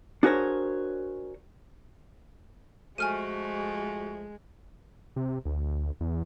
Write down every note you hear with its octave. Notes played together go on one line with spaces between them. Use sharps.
D4 F#4 G#4 A#4 C5 C#5
F3 G#3 A3 F#4 G#5 F6 D#7
C3
D2
E2